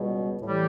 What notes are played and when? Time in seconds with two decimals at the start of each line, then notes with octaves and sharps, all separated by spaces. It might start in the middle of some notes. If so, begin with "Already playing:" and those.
Already playing: C#2 B2 G3
0.41 A2 E3 G3